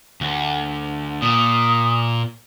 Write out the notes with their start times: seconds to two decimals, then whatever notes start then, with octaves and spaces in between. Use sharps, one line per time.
0.21 D2
1.22 A#2 D#6